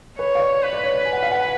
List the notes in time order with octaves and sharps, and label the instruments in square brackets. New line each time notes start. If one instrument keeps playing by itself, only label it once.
[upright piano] B4 [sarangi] C#5
[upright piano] F5
D5
[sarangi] B4
[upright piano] D5
C#5
D5
G#5
F#5
F5
F#5